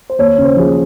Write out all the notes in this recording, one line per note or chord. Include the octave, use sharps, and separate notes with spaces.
C5
D#2 C#5
C#3
C5
F3 G#4